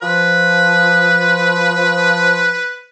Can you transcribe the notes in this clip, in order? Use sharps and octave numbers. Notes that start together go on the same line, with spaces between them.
F3 B4